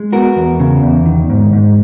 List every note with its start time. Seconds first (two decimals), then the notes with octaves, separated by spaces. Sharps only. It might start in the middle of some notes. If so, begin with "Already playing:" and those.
Already playing: G#3
0.13 B3 F#4 A#4
0.36 E2
0.60 C#3
0.83 E2
1.06 D#3
1.30 G#2
1.53 G#2